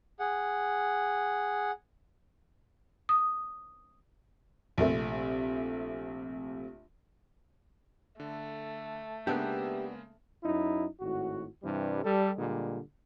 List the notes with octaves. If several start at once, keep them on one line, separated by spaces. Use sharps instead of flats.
G#4 F#5
D#6
A#1 C3 A3
D3 A3
C#3 G#3 A#3 B3 D4 G4 E5 F#6
F#2 D#4 E4
G#1 A2 F#4
G2 C3 E3 G3
G3 A4
A#2 D3 G3 G#3